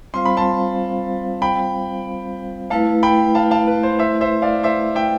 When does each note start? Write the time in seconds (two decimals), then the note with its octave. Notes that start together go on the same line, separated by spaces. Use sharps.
0.14 G3 C4 F4 C5 F5 C6
0.25 B5
0.37 A5 C6
1.42 G5 B5
2.70 A3 E4 B4 F5 A5
3.03 G5 B5
3.35 F5 A5
3.51 F5 A5
3.67 B4
3.83 C5
3.99 C5 E5
4.21 C5 E5
4.42 D5 F5
4.63 C5 E5
4.95 E5 G5